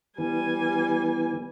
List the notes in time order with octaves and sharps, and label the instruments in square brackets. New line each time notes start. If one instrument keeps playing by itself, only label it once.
[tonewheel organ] E3 B3 [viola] G3 G#5